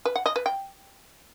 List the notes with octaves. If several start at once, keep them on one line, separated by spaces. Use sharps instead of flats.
B4
F#5
D#5
B4
G5